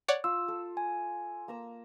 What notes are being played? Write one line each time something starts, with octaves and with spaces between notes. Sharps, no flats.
C#5 D5 F#5
F4 E6
A4
G#5
A#3 A#5 E6